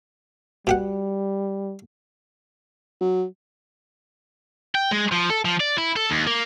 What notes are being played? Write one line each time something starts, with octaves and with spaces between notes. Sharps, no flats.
B2 G3 G4 F#5
F#3
G5
G#3
F3
A4
F3
D5
E4
A4
D#2
A#3